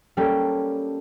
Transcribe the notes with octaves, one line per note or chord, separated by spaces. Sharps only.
G3 A#3 C#4 G4 A4